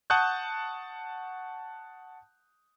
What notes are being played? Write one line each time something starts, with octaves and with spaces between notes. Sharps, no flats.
F#5 A5 C#6 D#6 F#6 G6